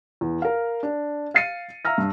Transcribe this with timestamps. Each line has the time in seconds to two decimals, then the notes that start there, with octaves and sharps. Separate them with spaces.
0.21 E2
0.42 A#4 F5
0.83 D4
1.34 F5 A6 C7 C#7 D#7
1.85 E5 F5 A#5 E6 F6 A#6
1.98 G2